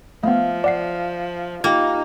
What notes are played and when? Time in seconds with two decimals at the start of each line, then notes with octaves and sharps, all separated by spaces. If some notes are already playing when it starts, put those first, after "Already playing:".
0.24 F3 A3 B3 E5 F5
0.64 D5 F#5 C7
1.64 A#3 D#4 F4 G4 G5